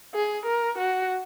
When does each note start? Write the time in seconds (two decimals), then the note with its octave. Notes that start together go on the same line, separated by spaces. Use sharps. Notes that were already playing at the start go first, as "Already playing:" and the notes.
0.14 G#4
0.45 A#4
0.78 F#4